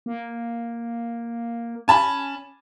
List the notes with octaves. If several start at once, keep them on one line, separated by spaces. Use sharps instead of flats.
A#3
C#4 G#5 A5 B5